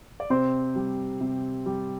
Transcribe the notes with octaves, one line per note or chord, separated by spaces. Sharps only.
D5
C3 C4 C5
G3
C3
G3